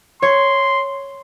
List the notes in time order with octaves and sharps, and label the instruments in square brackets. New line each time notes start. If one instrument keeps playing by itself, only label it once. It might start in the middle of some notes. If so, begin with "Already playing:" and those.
[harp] C#5 [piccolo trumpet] C6